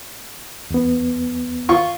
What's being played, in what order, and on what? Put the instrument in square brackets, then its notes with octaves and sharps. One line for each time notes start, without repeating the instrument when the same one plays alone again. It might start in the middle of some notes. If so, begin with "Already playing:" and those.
[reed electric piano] E2 B3
[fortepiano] F4 C#6